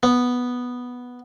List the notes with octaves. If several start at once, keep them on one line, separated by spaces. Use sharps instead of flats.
B3